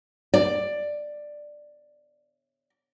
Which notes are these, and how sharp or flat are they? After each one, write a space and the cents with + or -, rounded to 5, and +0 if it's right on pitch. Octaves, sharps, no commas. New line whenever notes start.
D5 +10